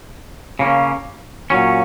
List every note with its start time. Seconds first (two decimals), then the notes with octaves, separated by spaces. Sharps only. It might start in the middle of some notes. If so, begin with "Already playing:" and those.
0.59 C#3 A#3 C#4
1.50 A#2 F#3 C#4